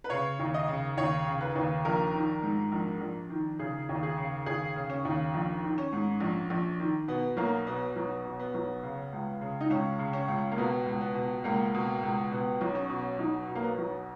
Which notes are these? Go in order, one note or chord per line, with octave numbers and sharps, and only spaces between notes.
B4
C#3 C#5
D#2
D#5
C#3
D#2 C#5
C#3
B4
D#2
A#1 A#4
D#3
G#2
A#1
A#1
D#3
C#3 G#4
D#2
G#4
C#3
D#2 G#4
C#3
C#4
D#2
A#1
D#3
C#4
G#2
A#1
A#1
D#3
B2 B3
B1 A#3
B2 B3
B1 B3
B2
B3
B1
C#3
C#2
C#3
D#4
C#2 C#4
C#3
C#4
C#2
A#3
B2 B3
C#2
B3
B2
C#2 A#3
B2
C#2
B2 B3
B1
C#4
B2
B1 D#4
B2
A#3
B3
B1